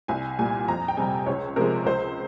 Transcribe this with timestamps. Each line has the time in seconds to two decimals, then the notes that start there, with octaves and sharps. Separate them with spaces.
0.08 C2 G#5
0.38 A#2 G3 G#5
0.68 F2 A#5
0.88 G5
0.97 C3 G3 G#5
1.26 C#2 C#5
1.56 C3 F3 G#3 A#4
1.86 C#2 C5